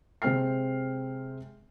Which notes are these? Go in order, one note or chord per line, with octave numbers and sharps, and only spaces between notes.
C3 G#3 C4 G5 F6 C7